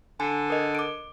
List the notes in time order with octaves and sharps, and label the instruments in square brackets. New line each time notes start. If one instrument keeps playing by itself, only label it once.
[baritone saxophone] D3 [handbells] G#5
[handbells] A#4 D#5
D6 D7